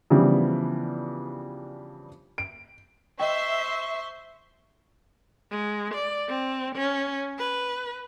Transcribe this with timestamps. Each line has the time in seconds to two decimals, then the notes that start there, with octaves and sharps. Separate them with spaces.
0.10 C#3 E3 F3 G3 B3 D4
2.38 D7
3.20 C5 D#5 E5 G5 C6 C#6
5.51 G#3
5.94 D5
6.29 C4
6.75 C#4
7.39 B4